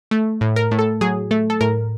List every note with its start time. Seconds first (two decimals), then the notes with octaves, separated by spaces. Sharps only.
0.11 A3
0.41 A2
0.56 A#4
0.71 A2
0.79 A4
1.01 F#3 G#4
1.31 A3 A4
1.50 A4
1.61 A2 A#4